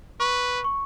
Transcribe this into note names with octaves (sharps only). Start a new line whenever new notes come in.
B4 C#6
C#6